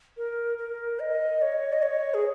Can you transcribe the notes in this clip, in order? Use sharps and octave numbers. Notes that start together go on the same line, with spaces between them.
A#4
A#4
D#5
C#5
D#5
C#5
G#4